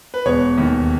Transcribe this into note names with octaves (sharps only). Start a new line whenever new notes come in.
B4
E1 C#5
D#2 D#3